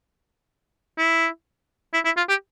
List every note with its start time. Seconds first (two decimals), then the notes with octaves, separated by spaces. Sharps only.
0.98 E4
1.94 E4
2.05 E4
2.17 F4
2.29 G4